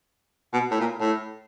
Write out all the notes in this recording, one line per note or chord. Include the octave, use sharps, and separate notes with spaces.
B2
A2
A#2
A2